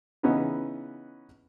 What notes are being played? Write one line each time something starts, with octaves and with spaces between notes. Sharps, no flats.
C#3 E3 B3 C#4 D#4 B4